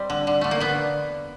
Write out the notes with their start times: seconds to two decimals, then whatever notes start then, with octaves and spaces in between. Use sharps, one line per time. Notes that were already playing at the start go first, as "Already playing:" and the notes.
Already playing: G3 C4
0.10 D3
0.27 D3
0.41 D3 A3
0.51 A#3
0.60 D3 B3